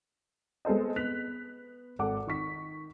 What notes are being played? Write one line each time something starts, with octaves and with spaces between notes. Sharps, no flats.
G#3 B3 A4 C5 D#5
B3 F#6 B6 F7
G#1 A4 F#5 D6
D#3 C#6 B6